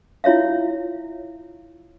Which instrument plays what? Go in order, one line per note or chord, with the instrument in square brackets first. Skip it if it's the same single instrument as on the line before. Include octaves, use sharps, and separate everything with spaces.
[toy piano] E4 F4 C#5 E5 F5